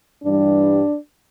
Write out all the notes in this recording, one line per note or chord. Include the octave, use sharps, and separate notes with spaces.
G2 E3 G3 D4